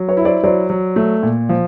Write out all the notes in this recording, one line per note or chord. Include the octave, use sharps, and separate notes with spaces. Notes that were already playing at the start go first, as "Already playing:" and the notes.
Already playing: F#3
B4 C#5
E4
C5 D5
F#3 C5 D5
F#3
A3
A#2
F3